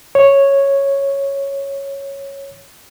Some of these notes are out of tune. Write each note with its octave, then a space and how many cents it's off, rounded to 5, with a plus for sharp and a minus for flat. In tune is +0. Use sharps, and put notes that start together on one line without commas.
C#5 -5